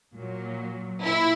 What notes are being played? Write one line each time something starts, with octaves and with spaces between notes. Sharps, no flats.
A#2 F#3
A#2 E4